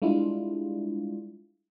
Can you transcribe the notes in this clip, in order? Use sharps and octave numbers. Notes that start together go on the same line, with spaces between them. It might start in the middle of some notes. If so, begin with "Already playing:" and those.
G3 G#3 D4 E4 F4